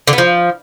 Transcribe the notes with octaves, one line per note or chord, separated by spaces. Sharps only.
D3
B3
F3